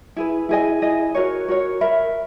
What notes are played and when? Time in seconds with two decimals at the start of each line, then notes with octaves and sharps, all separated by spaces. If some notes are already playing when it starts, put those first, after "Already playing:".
0.16 E4 G#4 B4
0.49 E4 G#4 D#5 G#5
0.82 E4 G#4 D#5 G#5
1.14 F#4 A#4 C#5
1.48 F#4 A#4 C#5
1.81 A#4 E5 B5